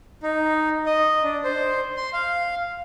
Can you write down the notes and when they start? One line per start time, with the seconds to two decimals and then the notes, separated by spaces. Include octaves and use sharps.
0.23 D#4
0.86 D#5
1.24 D4
1.44 C5
1.97 C6
2.13 F5